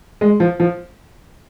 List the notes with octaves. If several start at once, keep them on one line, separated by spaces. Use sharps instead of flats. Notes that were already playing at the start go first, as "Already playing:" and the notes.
G#3
F3
F3